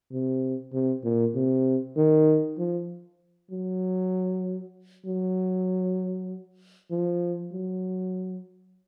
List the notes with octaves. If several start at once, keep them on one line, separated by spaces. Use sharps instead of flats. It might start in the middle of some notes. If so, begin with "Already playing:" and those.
C3
C3
A#2
C3
D#3
F3
F#3
F#3
F3
F#3